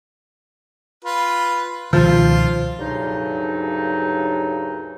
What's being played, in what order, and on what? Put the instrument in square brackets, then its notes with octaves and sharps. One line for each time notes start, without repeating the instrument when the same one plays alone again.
[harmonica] F4 B4
[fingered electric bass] C#2 B2 D#3 [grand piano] F3 [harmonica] F4
[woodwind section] D2 G2 C#3 F#3 D#4